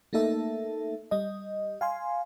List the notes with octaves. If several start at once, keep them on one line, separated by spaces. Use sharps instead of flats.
A3 A#3 D#4 A4 E5
G3 D#5
F5 G#5 C6